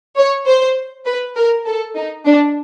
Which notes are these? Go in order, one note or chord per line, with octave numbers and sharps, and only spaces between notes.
C#5
C5
B4
A#4
A4
D#4
D4